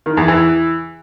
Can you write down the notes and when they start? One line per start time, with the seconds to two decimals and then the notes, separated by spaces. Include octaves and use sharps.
0.06 D#3
0.17 E2
0.28 E3